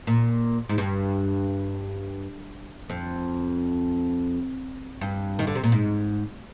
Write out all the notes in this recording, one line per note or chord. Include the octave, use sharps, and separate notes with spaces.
A#2
G#2
G2
F2
G2
D#3
D3
C3
A#2
G#2